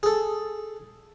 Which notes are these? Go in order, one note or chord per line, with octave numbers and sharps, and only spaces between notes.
G#4 A4